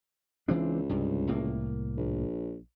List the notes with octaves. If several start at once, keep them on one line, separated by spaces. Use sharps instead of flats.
C#2 E3 C4 D4
C2 G2
C2 A2 A#3
A#1